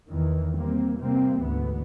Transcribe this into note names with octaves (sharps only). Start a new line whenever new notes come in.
E2 D#3 E3
G3 A#3 C4
C3 E3 G3 A#3 C4
D2 G#2 D3 E3 B3